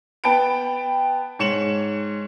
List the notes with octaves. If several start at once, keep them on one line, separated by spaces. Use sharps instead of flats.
B3 G5 A5 B5 D7
G#2 C#5 C#7 E7 F#7